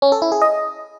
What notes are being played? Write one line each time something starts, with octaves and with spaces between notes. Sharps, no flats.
C#4
A4
E4
G#4
D#5